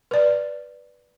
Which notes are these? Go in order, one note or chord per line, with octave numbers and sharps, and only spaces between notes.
B4 D5